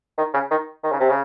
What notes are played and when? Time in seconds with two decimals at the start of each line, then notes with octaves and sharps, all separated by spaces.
0.18 D#3
0.34 C#3
0.51 D#3
0.83 D#3
0.92 C#3
1.00 C3
1.09 C#3